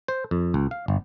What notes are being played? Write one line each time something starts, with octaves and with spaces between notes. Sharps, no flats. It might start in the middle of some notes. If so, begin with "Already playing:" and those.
C5
F2
C#2
F5
G1